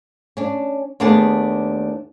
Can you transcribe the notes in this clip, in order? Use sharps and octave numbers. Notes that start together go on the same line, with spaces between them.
C#4 D4
D#2 A3 B3 D4 G#4 A5